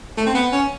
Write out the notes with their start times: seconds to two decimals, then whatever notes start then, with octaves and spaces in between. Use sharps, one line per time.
0.17 A3
0.26 C4
0.35 B3
0.52 C#4